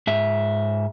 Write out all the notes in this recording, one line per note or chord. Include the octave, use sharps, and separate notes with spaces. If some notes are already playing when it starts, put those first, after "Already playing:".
G#2 E5